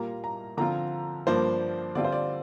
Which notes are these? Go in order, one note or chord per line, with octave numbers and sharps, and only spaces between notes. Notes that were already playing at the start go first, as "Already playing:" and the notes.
Already playing: A#2 G3 A#3 F4 A#5
A#5
D3 F3 C4 F4 A#5
G2 F3 A#3 D4 C5
D3 G3 C4 F4 D5
C5
D5